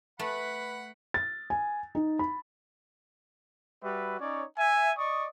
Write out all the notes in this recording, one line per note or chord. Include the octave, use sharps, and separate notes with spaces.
A3 B4 F#5 B5
A6
G#5
D#4
B5
G3 F#4 B4 E5
C#4 D#4 C#5 D5
E5 G#5
D5 D#5 C#6 D#6